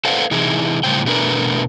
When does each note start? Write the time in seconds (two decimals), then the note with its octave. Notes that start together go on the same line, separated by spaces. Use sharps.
0.05 A4 B4 C5 D5 F5 F#5
0.31 C3 E3 D#4 E4 G#4
0.83 A2 C#3 G3 C5 G5
1.05 E2 B2 A3 D4 A#4 B4